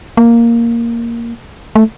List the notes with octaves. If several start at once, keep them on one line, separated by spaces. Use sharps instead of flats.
A#3
A3